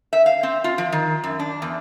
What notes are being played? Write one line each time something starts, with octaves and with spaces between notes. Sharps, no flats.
E5
F5
C4
F4
F3
D#3
F#2
D4
E2